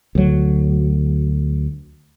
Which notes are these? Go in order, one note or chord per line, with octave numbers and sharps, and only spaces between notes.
D2 F#3